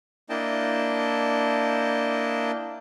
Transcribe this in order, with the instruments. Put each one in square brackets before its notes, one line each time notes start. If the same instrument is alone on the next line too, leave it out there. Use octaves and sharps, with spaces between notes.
[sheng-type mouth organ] A#3 D4 E4 D#5 G5 A5